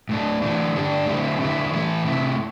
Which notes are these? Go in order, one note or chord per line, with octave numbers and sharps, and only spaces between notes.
A2 A3 D4
E3 A3 D4
D3 G3 D4
D3 A3 C4 E4
D3 G3 E4
E3 A3 E4
C3 A3 E4